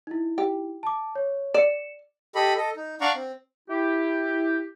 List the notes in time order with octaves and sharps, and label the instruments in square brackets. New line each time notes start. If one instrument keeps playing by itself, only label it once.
[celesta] D#4 E4
[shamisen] G4
[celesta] A5 D6
C#5
[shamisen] D5 [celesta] C#7 E7
[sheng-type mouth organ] G4 A4 D#5 B5
A4 D#5
D#4
D4 D5 F5 F#5 A#5 C#6
C4
[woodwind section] E4 G4